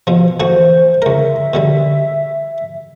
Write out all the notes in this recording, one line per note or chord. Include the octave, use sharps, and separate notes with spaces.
B2 F3
E3 A3 F#4 C5
C#2 A#4 E5
B2 D3 G3